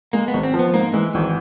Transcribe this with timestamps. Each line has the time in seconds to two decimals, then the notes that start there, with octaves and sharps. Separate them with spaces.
0.13 G#3 A#3
0.28 B3
0.33 G#1
0.43 C4
0.54 F3
0.59 B3
0.74 G#2 A#3
0.93 E3 G#3
1.15 G#1 E3